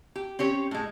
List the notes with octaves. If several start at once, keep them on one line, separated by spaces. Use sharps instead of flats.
G4
C4 C#4 G4 C#5
A2 G#3